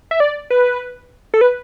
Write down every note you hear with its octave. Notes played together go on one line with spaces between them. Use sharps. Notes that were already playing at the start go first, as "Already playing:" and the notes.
E5
D5
B4
A4
B4